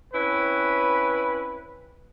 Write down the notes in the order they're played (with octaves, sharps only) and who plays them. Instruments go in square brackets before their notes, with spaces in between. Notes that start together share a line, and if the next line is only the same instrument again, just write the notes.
[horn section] C4 C#4 E4 B4